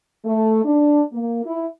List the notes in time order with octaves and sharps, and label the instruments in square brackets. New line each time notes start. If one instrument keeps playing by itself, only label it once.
[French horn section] A3
D4
A#3
E4